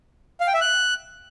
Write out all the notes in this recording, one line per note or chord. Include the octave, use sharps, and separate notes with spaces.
F5
G5
E5
F#6